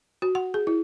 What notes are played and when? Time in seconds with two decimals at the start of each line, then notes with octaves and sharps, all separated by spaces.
0.22 F#4
0.35 F#5
0.54 G#4
0.67 E4